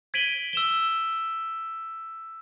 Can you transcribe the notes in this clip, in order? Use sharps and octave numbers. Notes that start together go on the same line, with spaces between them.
G#6 B6 D7 D#7 F#7 G7
E6 E7 G7